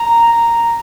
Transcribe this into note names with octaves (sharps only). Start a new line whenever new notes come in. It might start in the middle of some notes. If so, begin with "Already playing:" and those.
Already playing: A#5